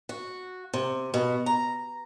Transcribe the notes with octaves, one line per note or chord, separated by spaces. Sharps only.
F#4
C3
B2
A#5